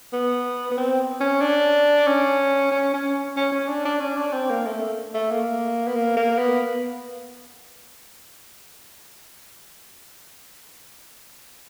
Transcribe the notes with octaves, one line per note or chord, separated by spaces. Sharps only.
B3
B3
C4
C#4
D4
C#4
C#4
C#4
C#4
C#4
D4
D4
C#4
D4
C4
A#3
A3
A3
A#3
B3
A#3
A#3
B3